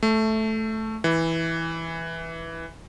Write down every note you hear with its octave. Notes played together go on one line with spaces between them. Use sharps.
A3
E3